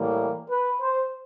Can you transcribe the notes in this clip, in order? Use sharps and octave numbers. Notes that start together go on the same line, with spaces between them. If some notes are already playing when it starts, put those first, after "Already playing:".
Already playing: A2 E3 G3 A#3
B4
C5